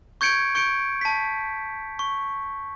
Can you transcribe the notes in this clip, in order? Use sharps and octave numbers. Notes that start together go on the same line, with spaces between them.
C#6 G6 G#6 C#7 D7
C#6 G6 C#7 D7
A5 B6
C#6